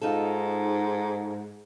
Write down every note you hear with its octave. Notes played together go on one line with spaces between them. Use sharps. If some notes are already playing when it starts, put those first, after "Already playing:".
G#2 D#4 F4 A4